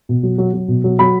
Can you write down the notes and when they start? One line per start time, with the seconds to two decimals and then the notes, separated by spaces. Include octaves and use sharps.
0.09 B2
0.23 F#3
0.38 F#3
0.53 F#3
0.68 B2
0.84 F#3
0.99 F#3 B5